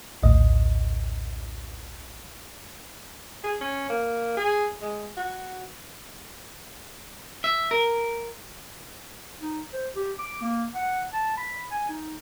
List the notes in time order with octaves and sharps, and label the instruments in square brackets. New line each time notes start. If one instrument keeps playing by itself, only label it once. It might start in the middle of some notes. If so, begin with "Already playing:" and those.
[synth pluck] A#1 D#2 A2 D#5
[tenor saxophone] G#4
C#4
A#3
G#4
G#3
F#4
[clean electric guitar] E5
A#4
[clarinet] D#4
C5
G4
D6
A#3
F#5
A5
B5
G#5
D#4